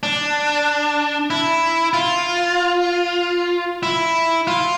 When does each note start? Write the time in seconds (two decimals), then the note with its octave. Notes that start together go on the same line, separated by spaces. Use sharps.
0.03 D4
1.30 E4
1.93 F4
3.83 E4
4.47 F4